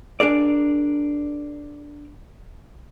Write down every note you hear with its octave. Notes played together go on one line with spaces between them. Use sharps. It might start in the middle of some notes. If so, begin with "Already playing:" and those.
D4 G#4 A#4 D5